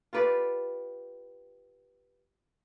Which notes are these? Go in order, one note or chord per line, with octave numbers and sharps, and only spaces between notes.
F4 G4 B4 D5